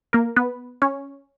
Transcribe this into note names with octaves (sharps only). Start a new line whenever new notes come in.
A#3 A#4
B3 B4
C#4 C#5